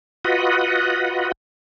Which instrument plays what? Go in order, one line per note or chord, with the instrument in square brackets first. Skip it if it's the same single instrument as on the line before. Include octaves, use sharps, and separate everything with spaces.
[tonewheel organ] F4 F#4 B4 D#5 F#5